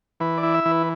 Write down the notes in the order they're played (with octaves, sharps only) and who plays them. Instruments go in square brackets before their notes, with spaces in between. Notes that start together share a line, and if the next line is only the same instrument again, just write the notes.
[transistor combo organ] E3 B4
D5
E4
E5
E3
B4